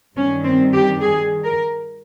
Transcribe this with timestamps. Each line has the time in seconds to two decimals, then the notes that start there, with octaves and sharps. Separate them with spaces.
0.16 G2 D#3 G3 C#4
0.44 C4
0.73 G4
1.01 G#4
1.44 A#4